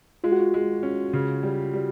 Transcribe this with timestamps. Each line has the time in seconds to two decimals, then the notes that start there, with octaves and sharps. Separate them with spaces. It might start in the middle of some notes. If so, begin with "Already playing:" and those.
0.24 G#3 F4
0.32 F#4
0.40 F4
0.54 G#3
0.83 C#4
1.13 C#3
1.43 G3
1.73 G3